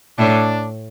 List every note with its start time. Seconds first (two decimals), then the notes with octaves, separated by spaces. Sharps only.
0.18 A2 D4